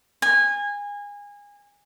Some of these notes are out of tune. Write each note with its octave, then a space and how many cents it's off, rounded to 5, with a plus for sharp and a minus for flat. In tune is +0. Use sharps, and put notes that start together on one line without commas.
G#5 -25